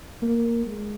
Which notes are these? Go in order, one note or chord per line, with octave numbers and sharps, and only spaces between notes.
A#3
G#3